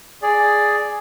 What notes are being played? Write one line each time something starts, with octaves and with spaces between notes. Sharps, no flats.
G#4 D5